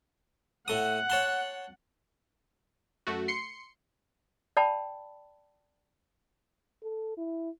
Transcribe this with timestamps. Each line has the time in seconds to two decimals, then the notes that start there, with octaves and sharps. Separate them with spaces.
0.68 A2 A3 F#5 D#6
1.10 C#5 A5 C6
3.07 F#2 A3 F#4
3.28 C6 C7 C#7
4.57 D5 G5 A5 B5
6.83 A4
7.17 E4